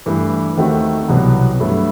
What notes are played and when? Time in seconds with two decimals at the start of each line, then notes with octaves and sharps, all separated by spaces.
0.06 G2 E3 A3
0.57 D#2 D#3 A3 C4 F#4
1.09 C2 B2 F#3 B3
1.60 G2 F#3 A3 E4 B4